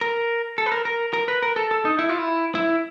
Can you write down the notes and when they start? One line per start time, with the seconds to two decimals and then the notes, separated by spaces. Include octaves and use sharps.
0.01 A#4
0.58 A4
0.66 B4
0.72 A#4
0.85 A#4
1.13 A#4
1.28 B4
1.43 A#4
1.56 A4
1.71 A4
1.85 D#4
1.99 E4
2.09 F4
2.18 E4
2.55 E4